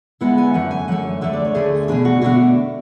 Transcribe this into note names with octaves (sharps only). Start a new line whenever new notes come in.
D3 G#3 B3 E4 F#5
G#5
F#2 D3 F#3 A3 F#5
G#5
F#2 D3 F#3 A3 F#5
D2 D3 A3 E5
D5
C#5
D2 D3 A3 G#4
B2 A3 D4 G#4
F#4
B2 A3 D4 F#4